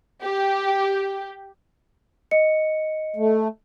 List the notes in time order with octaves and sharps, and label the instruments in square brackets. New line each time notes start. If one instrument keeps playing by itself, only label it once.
[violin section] G4
[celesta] D#5 C#7
[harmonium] A3